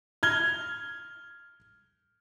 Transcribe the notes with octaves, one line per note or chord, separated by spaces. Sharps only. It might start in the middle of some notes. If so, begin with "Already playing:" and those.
F6 G#6 G7